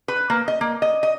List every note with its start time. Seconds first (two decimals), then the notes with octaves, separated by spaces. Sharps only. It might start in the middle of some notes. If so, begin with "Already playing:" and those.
0.08 B4
0.30 A#3
0.48 D#5
0.61 A#3
0.82 D#5
1.03 D#5